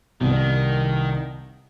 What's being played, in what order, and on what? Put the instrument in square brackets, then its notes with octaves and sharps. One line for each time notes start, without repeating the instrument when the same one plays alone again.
[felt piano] C2 [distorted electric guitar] D#3